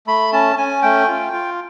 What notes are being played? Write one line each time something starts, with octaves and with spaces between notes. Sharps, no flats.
A3 B5
C#4 A5
C#4 G#5
A3 G5
F4
F4